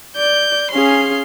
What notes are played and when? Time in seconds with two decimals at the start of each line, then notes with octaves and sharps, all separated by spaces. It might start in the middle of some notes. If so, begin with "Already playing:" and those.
0.16 D5 G6
0.71 C#4 G#4 F5 C6